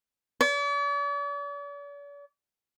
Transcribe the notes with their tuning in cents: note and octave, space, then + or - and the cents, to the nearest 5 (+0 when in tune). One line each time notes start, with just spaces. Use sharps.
D5 -45